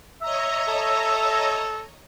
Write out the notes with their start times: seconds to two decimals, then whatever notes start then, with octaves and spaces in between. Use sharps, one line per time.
0.22 C#5 D#5 E5 A#5
0.68 A4